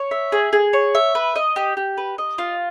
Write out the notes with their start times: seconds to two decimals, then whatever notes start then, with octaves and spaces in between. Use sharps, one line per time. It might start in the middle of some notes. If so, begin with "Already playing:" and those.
Already playing: C#5
0.11 E5
0.32 G#4
0.53 G#4
0.73 C#5
0.95 E5
1.15 B4
1.36 D#5
1.56 G4
1.77 G4
1.97 B4
2.18 D#5
2.38 F4